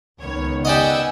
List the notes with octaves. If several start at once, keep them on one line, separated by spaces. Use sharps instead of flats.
C#2 D#3 B3 C#5
G4 D5 D#5 F#5 G#5 E6